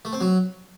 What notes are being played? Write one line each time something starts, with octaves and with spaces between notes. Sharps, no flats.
A3
C4
F#3